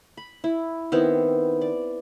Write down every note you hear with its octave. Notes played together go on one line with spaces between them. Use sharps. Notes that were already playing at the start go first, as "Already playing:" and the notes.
B5
E4
D#3 B3 C4 E4
D5